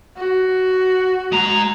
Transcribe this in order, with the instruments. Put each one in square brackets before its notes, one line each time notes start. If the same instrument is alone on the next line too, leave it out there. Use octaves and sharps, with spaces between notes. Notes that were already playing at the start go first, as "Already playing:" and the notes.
[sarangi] F#4
[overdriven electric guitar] G#3 A#5